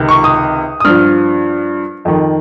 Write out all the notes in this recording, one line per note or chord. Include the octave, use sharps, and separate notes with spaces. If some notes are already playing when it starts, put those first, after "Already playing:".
Already playing: C#2 C3 D#3
C#6
D#6
D#6
G2 F3 F6
F2 D#3